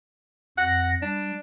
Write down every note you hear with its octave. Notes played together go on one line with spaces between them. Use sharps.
F2 F#5 A#6
G3 D4